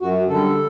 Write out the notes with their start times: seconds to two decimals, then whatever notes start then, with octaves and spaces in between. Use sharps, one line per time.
0.01 F#2 F#4
0.29 D3 G3 A4